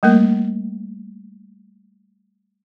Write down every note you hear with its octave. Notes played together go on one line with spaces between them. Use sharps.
G3 A3 A#3 A#4